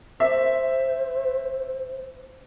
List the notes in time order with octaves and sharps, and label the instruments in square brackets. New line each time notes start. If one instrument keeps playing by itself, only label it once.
[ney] C5 [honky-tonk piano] E5